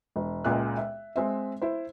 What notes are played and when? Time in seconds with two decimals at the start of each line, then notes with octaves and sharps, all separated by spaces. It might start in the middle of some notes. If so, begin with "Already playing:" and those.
0.16 E1
0.45 C#2 A#2 G#3 E5 F#6
0.77 E5
1.16 G#3 C4 E5
1.62 E4 C5